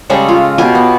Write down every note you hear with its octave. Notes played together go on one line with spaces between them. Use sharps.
C#3 G3 G#3 A4
F4
B2 G4 G#5
B3